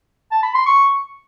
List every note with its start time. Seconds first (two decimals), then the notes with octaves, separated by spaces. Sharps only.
0.31 A5
0.43 B5
0.54 C6
0.66 C#6